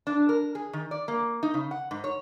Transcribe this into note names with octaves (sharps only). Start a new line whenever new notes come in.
D4
A#4
G#4
D#3
D5
A#3
D#4
C#3
F#5
G#2
C#5